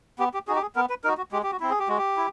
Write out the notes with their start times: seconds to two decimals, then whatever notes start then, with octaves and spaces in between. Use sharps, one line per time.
0.19 B3 G4
0.34 G4
0.48 D#4 F#4 G#4
0.55 G4
0.62 G#4
0.76 B3 A#4
0.90 B4
1.04 D#4 F#4 A#4
1.17 F#4
1.32 G#3 G4
1.43 G4
1.51 F#4
1.60 C4 E4
1.70 G#4
1.79 G4
1.88 G#3 F#4
1.98 G4
2.17 E4